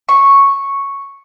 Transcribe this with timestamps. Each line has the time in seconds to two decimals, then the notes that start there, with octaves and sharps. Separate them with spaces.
0.09 C#6